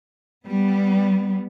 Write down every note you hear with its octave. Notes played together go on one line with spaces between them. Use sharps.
G3 B3